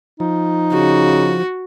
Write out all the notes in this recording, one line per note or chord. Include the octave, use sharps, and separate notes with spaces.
F3 D#4
C#3 F#4